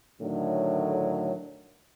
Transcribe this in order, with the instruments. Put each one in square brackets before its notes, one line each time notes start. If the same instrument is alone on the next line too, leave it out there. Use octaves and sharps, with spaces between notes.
[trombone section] A2 D3 D#3 F#3